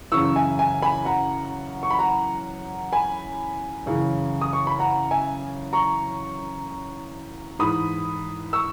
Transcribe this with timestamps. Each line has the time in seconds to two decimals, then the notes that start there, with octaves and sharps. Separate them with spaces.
0.12 F#2 C#3 E3 C#6 E6
0.36 E5 G#5
0.59 E5 G#5
0.82 G#5 B5
1.05 F#5 A#5
1.83 C#6
1.91 B5
1.99 F#5 A#5
2.92 G#5 B5
3.86 F#2 C#3 E3
4.41 D#6
4.53 C#6
4.67 B5
4.79 F#5 A#5
5.11 E5 G#5
5.73 A#5 C#6
7.59 G#2 E3 B5 D#6
8.53 C#6 E6